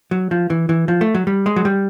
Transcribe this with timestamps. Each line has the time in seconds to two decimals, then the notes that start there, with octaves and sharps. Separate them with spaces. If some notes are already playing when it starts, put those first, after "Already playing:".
0.11 F#3
0.31 F3
0.50 E3
0.69 E3
0.88 F3
1.01 A3
1.15 F#3
1.27 G3
1.46 G#3
1.56 F#3
1.65 G3